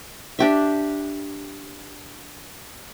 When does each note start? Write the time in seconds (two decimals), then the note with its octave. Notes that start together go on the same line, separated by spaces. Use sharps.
0.39 D4 G4 E5